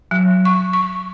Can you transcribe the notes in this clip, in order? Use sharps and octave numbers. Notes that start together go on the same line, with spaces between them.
F#3
C#6
C#6